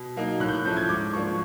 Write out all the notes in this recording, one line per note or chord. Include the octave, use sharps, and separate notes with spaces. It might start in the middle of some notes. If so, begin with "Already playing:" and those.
Already playing: B2
F#3 A#3 D#4
A2 F#6
G6
F#6
F3 A3 C#4 E4 G6
G#6
G#2 D6
F3 A#3 D4 C#6